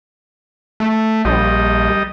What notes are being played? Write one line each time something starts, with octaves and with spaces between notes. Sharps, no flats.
A3
A#1 G3 D#5